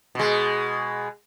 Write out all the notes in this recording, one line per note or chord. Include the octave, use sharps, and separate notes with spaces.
B2 G#3